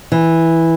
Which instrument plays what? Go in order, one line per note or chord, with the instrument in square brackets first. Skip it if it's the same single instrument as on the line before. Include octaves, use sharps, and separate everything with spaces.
[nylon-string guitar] E3